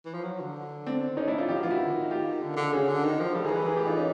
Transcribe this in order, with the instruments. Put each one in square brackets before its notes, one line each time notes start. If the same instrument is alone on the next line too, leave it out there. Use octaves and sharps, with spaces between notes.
[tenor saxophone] E3
F3
F#3
D3
[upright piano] C4 D4
[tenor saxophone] D3
[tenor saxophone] D#3 [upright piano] C#4 D#4
[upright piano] D4 E4
D#4 F4
[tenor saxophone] F3 [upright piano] G4
[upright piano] F#4
[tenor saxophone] E3 [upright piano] F4
[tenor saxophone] D#3 [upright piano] E4 F#4
[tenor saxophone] D3
D#3
[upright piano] F4 G4
[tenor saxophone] D3
D3
[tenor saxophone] C#3 [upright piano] F#4 G#4
[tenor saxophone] D3
D#3
F3
[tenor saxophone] G3 [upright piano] G4 A4
[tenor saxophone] D#3 [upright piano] G#4 A#4
[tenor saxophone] E3 [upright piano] A4 B4
[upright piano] G#4 A#4
G4 A4
D#4 F4
C#4 D#4